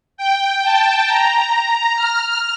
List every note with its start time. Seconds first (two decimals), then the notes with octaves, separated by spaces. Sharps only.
0.17 G5
0.63 A5
1.08 A#5
1.96 F6